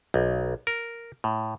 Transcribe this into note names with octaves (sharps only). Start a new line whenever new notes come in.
B1
A#4
A2